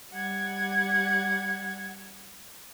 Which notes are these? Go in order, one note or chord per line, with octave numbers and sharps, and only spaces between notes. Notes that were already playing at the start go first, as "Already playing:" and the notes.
G3 F#5 G#6